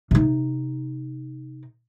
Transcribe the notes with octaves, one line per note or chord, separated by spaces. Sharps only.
C3 D#4